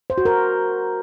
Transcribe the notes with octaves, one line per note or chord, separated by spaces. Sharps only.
C5
F#4
A#4